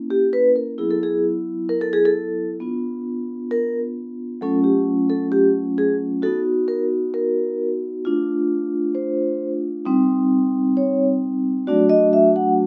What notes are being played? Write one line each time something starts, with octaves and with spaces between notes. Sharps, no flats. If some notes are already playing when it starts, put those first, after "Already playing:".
Already playing: A#3 C#4 E4
G4
B4
A#4
F#3 B3 E4 G#4
A4
G#4
A#4
A4
G#4
A4
B3 D4 F4
A#4
F#3 A3 C#4 F4 A4
G4
A4
G4
G#4
B3 D#4 F#4 A4
A#4
A#4
A3 D4 F4
C5
G3 C4 D#4
C#5
F#3 A3 D4 F#4 D5
D#5
E5
F#5